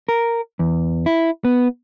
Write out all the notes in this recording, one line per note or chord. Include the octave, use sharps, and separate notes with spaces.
A#4
E2
E4
B3